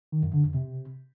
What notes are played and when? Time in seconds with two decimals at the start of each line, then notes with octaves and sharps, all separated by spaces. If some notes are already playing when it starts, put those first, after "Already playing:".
0.12 D#3
0.23 F#2
0.33 D3
0.44 F2
0.54 C3